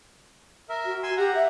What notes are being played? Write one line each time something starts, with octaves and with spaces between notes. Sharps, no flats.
A#4 E5
F#4
G#5 C6 E6
G4 F#5 A#5
E5